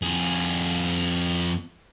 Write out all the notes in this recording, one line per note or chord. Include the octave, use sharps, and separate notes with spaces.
F2 G#4